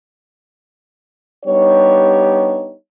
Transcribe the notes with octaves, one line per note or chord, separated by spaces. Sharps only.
G3 B3 D4 D#4 G4 C#5